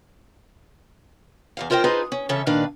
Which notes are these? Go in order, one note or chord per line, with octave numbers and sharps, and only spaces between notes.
E2 D#3 F5
E4 F4 A#4 C5 D#5 G5
D#4 F4 G#4 B4 C5 D#5
C#4
C#3 E3 C#4 A4 E5
A#2 D#3 D4 B4 F5